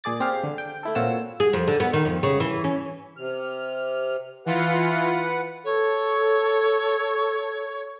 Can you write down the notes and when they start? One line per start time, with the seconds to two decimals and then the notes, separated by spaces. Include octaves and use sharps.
0.04 A#2 G#4 D5 A6
0.20 C4 G4 G#4 F5
0.44 D3
0.58 G5
0.83 A3 E4 A4
0.95 A#2 C4 F4 F#4 C#5 E6
1.40 G#4
1.53 F2
1.68 D3
1.80 B3
1.93 D#3
2.05 F2
2.23 C#3
2.40 E3
2.64 C#4
3.17 C3 F6
4.46 E3 F4 B4 F#5
5.65 A4 C#5